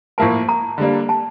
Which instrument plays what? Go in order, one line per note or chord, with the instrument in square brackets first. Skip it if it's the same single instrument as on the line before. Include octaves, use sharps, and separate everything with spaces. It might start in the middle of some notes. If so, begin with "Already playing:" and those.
[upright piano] A2 F3 A#3 E4 A#4 [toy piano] A5
[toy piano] A#5
[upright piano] D3 G3 A#3 D4
[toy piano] A5